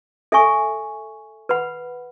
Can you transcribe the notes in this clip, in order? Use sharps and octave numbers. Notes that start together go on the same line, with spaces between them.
A4 E5 G#5 C#6
B4 F#5 B5